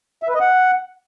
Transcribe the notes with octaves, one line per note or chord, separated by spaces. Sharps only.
E5
B4
D#5
F#5